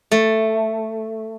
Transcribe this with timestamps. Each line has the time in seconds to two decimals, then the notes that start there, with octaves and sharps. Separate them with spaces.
0.11 A3